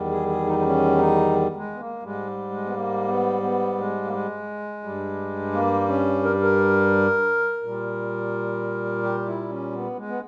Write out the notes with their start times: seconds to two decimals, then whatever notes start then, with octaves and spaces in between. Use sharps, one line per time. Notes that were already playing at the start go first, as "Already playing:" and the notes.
Already playing: E2 D#3 G3
0.11 G#4
0.28 G#4
0.46 D#4
0.59 D#4
0.63 C#4
0.98 D#4
1.57 G#3
1.74 B3
1.79 A#3
2.03 G#2 G3 G#3
2.50 G#3
2.65 B3
2.74 A#3
3.08 B3
3.43 B3
3.78 G#3
4.04 A#3
4.13 G#3
4.83 G2 G3
5.53 A#3
5.88 C#4
6.23 A#4
6.42 A#4
7.63 A#2 G3
9.03 G4
9.26 E4
9.50 C#4
9.73 B3
9.96 G#3
10.09 B3